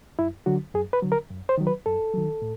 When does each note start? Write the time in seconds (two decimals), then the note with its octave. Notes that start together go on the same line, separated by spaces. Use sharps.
0.19 F#2 E4
0.46 D3 F#3 F#4
0.74 F#2 G#4
0.93 B4
1.02 D3 F#3
1.12 A#4
1.30 F#2
1.49 C5
1.58 D#3 F#3
1.67 B4
1.86 F#2 A4
2.13 D#3 F#3
2.42 A2